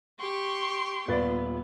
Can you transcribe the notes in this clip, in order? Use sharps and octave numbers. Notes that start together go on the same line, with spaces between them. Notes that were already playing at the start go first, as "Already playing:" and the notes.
G4 C6 C#6
D#1 B3 F4 B4 D5 A6